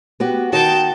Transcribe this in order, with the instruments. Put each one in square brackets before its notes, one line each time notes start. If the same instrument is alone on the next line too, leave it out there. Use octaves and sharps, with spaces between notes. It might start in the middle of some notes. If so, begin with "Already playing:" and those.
[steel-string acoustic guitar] B3 F#4 G4
[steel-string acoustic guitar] D#3 D#4 F#4 [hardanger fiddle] G5 A5